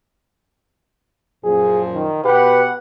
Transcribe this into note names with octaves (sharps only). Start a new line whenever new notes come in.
F#2 A#2 F3 G#4
D#3
B2 G4 B4 F#5